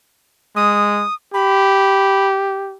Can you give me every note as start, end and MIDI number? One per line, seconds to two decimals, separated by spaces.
0.56 1.05 56
0.56 1.14 87
1.34 2.78 67
1.34 2.27 83